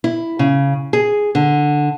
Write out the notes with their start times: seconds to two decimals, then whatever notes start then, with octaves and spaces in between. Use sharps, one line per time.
0.04 E4
0.39 C#3
0.93 G#4
1.35 D3